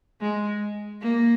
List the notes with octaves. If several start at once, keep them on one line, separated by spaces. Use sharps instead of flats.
G#3
A#3